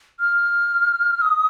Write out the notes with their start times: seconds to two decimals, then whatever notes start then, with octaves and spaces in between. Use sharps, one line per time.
0.20 F6
1.22 D#6